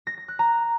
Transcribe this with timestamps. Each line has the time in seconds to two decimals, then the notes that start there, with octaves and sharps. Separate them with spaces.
0.07 A#6
0.18 A#6
0.28 F#6
0.39 A#5